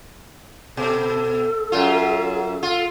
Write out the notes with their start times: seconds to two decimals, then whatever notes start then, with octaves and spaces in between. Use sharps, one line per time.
0.77 B2 A4
1.72 F#2 F4
2.63 F4